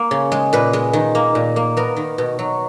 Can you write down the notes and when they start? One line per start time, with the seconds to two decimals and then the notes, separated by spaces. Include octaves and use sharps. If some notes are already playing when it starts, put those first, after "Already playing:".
Already playing: A#3
0.11 C#3
0.32 G#3
0.53 A#2 B4
0.73 G#3
0.93 D#3
1.15 A#3
1.35 A#2
1.56 A#3
1.77 B3 A#4
1.96 D#3
2.18 B2
2.39 F#3